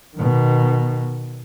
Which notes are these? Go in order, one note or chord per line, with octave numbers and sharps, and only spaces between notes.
B2 D#3